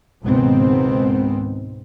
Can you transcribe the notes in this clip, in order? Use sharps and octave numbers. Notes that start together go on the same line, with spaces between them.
C#2 G#2 B2 D#3 B3 C4